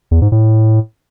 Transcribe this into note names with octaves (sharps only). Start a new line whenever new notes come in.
E2
G#2
A2